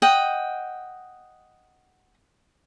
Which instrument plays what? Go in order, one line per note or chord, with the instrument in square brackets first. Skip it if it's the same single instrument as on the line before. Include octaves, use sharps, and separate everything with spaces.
[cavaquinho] D#5 F#5 G5